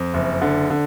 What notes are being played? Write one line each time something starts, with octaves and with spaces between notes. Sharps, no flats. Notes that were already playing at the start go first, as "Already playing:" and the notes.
Already playing: F2
F#1
D3
D3